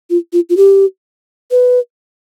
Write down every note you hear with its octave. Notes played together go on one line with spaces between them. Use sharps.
F4
F4
F4
G4
B4